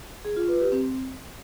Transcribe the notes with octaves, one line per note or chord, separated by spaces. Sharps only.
G#4
F4
B4
G4
C4